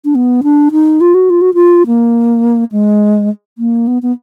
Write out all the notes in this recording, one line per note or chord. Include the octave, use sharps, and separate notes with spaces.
D4
B3
D4
D#4
F4
F#4
F4
F#4
F4
A#3
G#3
A#3
B3
B3